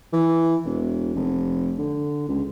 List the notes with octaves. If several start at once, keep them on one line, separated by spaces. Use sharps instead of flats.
E3
E1
F1
D3
C#2